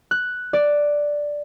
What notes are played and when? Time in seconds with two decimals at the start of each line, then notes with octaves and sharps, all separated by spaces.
0.11 F#6
0.53 D5